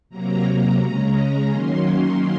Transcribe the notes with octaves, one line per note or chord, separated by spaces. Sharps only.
C3 F#3 A#3 A#5
A#5
C#3 G#3 C#4
D#3 F#3 A#3 C#4 C6